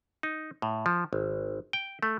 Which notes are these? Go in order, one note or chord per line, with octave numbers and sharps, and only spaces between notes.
D#4
A2
F3
G#1
G5
A3